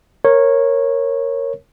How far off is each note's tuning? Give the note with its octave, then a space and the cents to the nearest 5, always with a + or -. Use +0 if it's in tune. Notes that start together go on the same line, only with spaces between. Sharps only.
A#4 +0 C#5 -15